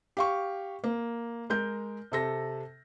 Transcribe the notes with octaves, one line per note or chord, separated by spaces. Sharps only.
G4 F5 C#6
A#3
G#3 A#4 G6
C3 A4 A#6